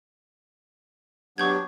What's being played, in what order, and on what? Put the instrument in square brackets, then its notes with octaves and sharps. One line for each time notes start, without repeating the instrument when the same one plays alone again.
[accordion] F#3 B3 D4 [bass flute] G4 [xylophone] C#6 G6 G#6